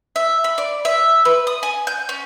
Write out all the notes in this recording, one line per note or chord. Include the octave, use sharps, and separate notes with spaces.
E5
B5
D5
E5
B4
D#6
G#5
G6
C#4